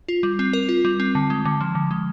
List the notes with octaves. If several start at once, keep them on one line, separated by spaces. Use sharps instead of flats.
F4
G3
C4
A#4
F4
G3
C4
D3
G#3
D3
F3
D3
G#3